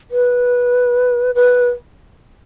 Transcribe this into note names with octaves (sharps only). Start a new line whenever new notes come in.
B4
B4